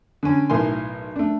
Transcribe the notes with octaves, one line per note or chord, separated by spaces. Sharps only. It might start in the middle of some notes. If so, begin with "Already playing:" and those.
D3 C#4
B1 A2 A#4 G#5 C6
A3 D4